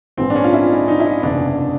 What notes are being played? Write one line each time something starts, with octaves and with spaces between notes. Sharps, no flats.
A#1 G#2 E3 C4
D4
C#4
F4
E4
D4
D#4
D#4
E4
D#4
F#1 E2 C3 D4